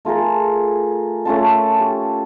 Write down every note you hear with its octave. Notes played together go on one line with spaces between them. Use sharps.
A3 F4 G#4 A#4
A3 C#4 F4 A5
G4